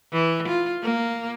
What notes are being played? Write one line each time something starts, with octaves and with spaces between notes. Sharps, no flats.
E3
F4
A#3